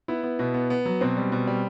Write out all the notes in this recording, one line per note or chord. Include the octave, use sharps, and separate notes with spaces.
B3 E4
B3
B2
B3
B3
F#3
B2 C4
G3
B2
G3